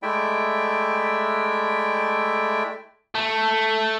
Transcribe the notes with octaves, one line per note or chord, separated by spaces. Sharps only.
G#3 A3 E4 D5 E5 G5
A3